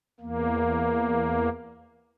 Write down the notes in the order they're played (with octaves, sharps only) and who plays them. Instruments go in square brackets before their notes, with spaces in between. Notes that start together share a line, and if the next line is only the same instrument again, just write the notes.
[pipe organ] E2 A#3